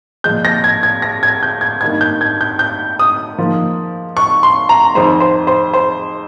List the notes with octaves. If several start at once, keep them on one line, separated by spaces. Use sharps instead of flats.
A#2 F3 G#3 G6
A#6
G#6
G#6
A#6
G#6
G6
G#6
G2 D#3 A#3 G#6
G6
G#6
G6
G6
D#6
G#2 F3 A#3
C#6
C6
A#5
F2 D#3 G#3 C5
C5
C5
C5